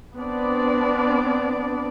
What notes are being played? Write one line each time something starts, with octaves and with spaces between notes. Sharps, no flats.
B3 C4 D4 D5